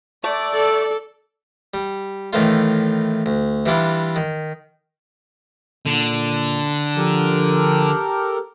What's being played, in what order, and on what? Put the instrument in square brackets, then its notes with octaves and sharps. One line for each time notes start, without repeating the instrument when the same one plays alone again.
[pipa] A3 [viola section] D5
[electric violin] A4
[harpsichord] G3
A2 D#3 E3 A3 F4
D2
E3 G3 D4 E4 F4
D#3
[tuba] A#2 [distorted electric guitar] D3
[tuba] F3 [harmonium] G4 A4 A#4